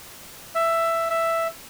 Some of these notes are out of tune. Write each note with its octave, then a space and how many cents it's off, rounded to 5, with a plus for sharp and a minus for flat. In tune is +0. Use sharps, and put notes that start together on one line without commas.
E5 +10
E5 +5